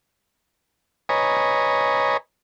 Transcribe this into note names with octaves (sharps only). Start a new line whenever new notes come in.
B4 C#5 D#5 G#5 A#5